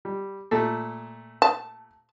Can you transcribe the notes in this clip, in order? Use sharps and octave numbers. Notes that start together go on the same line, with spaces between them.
G3
A#2 A3 A4
A5